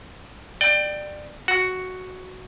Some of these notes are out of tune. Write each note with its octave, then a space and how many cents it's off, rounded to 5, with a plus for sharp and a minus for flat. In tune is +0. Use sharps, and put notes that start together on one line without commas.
D5 +25 G5 -10
F#4 +0 F#5 +0